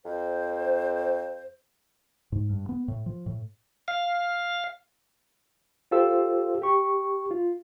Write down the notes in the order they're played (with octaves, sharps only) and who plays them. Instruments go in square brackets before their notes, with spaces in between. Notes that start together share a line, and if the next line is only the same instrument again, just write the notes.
[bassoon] F2 [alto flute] C5
[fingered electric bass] G#2
G2
B3
A2
F3
A2
[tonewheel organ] F5
[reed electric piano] F4 G4 A4 C5 F5 E6
G4 C#6
F4